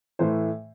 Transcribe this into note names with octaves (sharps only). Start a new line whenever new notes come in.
A2 E3 A3 C5